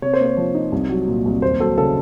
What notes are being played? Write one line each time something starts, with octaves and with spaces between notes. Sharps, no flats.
C3 C#5
C5
A#3
C#5
F3
D#4
C2
F#3
A#2
C2
D#2 C5
F#3 A4
C#3 A4